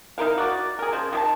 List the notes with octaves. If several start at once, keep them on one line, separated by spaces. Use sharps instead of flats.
D#4 E4 A#4 F5
F#4 D5
G#4 A#4
C#3 F3
D#3 G#4 A5